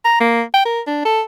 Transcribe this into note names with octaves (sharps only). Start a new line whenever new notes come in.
A#5
A#3
G5
A#4
D4
A4